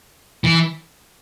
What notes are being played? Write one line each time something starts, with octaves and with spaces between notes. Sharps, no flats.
E3